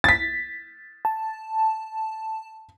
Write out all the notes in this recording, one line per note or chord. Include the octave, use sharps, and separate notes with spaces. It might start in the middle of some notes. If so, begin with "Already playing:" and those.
A6 B6
A5